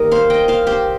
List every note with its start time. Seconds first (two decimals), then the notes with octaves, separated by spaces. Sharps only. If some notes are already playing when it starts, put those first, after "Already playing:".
Already playing: D#3 G3 A#3 A#4 D#5
0.11 C5 F5
0.30 D#5 G5
0.48 C5 F5
0.67 G4 C5